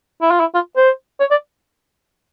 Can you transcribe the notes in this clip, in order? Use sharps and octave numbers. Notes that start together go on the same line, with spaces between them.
E4
F4
E4
F4
C5
C#5
D5